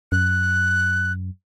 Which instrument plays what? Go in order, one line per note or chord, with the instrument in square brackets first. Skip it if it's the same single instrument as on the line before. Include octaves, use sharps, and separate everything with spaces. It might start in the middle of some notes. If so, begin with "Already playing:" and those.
[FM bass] F#2 [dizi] F#6